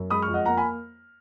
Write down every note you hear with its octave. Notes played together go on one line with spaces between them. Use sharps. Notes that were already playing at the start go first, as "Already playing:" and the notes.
Already playing: F#2
G#3 B5 D#6
C#6 F6
F2
D#5 F#5
A#3 F#5 A#5
G#5 B5